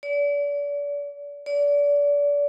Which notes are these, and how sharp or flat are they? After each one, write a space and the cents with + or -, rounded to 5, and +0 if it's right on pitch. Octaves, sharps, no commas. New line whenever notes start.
D5 -35
D5 -30